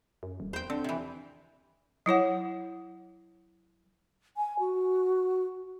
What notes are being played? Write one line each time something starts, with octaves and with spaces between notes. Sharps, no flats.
F#2
D#1
E2 C5 G5
D3 C4
C3 E3
F#3 E4 C#5 F#5
G#5
F#4